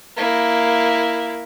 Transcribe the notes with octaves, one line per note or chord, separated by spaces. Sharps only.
A#3 E4